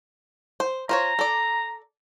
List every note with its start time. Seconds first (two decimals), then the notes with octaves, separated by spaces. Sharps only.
0.60 C5
0.89 F4 C5 C#5 A#5
1.19 A4 D5